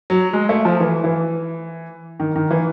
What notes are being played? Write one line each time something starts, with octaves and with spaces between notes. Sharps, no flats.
F#3
G#3
A3
F3
E3
E3
D#3
D#3
E3